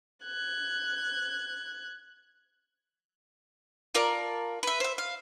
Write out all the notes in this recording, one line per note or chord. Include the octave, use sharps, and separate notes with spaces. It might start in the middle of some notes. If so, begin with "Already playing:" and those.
F#6 G#6
F4 A#4 D5 A5
B4 E5
C5 E5
F5